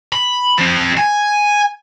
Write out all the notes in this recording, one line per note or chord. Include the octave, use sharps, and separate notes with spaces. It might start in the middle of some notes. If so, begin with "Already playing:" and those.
B5
F3 C4
G#5